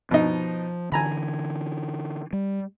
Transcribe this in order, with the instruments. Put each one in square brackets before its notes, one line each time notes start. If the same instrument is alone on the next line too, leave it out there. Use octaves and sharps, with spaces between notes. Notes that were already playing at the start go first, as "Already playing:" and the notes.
[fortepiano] B2 D#4 [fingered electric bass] F3
[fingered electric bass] D3 E3 [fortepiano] G#5 A#5 B5
[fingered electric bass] G3